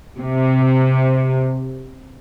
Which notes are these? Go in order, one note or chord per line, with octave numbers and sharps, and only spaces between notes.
C3